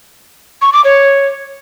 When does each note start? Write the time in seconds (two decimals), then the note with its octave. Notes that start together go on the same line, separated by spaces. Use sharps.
0.62 C#6
0.73 D6
0.85 C#5